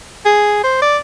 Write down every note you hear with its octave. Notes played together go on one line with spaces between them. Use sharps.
G#4
C5
D5